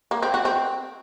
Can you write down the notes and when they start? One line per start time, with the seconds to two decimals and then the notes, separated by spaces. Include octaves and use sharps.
0.11 A#3
0.22 C4
0.34 F#4
0.45 C4